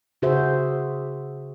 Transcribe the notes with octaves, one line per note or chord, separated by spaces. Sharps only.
C#3 F#4 G#4 C5 E5